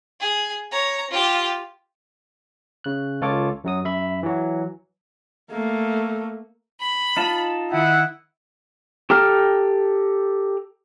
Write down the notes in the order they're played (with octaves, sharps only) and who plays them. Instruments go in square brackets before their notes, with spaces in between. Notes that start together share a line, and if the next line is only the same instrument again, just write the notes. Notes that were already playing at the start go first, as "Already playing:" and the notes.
[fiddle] G#4
C#5 A#5
F4 G4
[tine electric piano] C#3 F#6
C#2 F4 A4 C#5 D6
F#2 F#3 D#6
F#2 E5 B5
E3 F#3
[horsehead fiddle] A3 A#3
[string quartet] B5
[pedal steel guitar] D#4 F4 A5
[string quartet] D#3 [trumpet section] E4 F#5
[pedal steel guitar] G4 A4 G5 A#5 F6